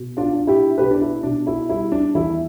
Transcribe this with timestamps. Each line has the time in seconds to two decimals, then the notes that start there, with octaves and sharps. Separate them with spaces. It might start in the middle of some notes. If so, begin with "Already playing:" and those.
Already playing: B2
0.17 D4 F4
0.33 D4
0.47 E4 G4
0.78 B2 G4 B4
0.91 D4
1.01 E4
1.23 B2 D4
1.47 E4
1.69 G3 E4
1.92 D4
2.15 E2 E4